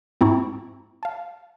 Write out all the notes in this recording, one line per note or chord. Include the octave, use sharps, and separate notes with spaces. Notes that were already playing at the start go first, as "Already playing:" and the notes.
G#2 C4 E4 A5 A#5 C#6
F5 A5